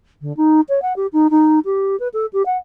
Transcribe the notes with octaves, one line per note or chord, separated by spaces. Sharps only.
D3
D#4
C#5
F#5
G4
D#4
D#4
G4
B4
A4
G4
F#5